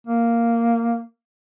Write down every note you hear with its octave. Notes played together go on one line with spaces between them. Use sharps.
A#3